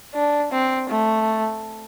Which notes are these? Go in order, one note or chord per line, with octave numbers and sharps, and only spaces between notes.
D4
C4
A3